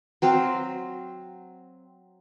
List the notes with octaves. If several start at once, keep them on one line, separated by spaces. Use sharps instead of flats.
F#3 C4 F5